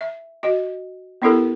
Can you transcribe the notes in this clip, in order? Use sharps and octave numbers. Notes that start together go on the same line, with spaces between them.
E5
F#4 D#5
B3 D4 E4 G4 A4 A#4